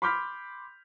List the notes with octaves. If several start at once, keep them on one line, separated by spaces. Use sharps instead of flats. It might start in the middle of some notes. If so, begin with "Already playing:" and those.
B5 C6 D6 F6 G6 B6